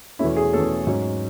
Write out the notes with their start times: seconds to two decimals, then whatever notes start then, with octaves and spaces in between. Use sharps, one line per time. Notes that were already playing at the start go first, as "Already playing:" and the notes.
0.19 E2 B2 A3 C#4 E4
0.36 G#4
0.53 E2 B2 A3 C#4 A4
0.87 G#2 F#3 C#4